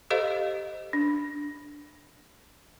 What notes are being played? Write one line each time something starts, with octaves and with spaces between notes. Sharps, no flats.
G4 A4 C5 D#5 F5
D4